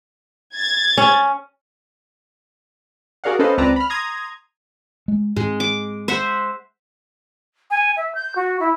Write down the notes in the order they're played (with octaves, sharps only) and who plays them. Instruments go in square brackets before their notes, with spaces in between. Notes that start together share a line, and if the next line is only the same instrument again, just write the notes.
[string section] G#6 A6
[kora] C#4
[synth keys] F#4 G#4 A#4 D5 F5 F#5
C#4 A4 B4 C5 D#5 F5
C#2 C4 B4 D5 A5 A#5
B5 F6
A#5 C6 D#6 G#6
[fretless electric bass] G#3
[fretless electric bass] G#2 C4 [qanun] G#3
[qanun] D6
C5 E5 F#5
[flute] G#5
E5
G6
F#4
E4